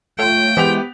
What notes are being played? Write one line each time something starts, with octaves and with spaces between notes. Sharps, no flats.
A3 F4 C#5 G5
E3 G#3 B3 G4 C5 F7